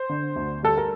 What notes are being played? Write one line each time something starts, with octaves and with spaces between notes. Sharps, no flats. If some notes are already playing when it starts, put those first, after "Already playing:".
Already playing: C5
D3
D2
G3 A4
A#4